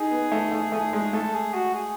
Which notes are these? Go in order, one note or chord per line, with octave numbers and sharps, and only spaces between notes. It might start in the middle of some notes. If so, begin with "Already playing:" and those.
Already playing: D#4 G#4
B3
A3
A3
A3
G#3
A3 A4
G#4
F#4
G#4